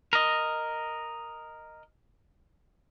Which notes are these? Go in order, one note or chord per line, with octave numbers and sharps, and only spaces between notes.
A#4 D#5